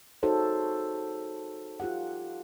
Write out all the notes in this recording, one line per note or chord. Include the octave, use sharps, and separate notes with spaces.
D#4 F#4 G#4 A4 C5 C#5
F4 G4 F#5